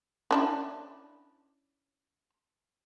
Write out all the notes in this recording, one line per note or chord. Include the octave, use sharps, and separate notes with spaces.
C#4 D4 E4